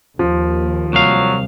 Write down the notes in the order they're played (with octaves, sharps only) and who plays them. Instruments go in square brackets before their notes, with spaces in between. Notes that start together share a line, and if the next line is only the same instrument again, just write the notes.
[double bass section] D#2 [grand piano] F3
[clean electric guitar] C2 F5 [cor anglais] F#3